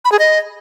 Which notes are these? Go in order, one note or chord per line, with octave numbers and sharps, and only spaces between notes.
B5
G#4
D#5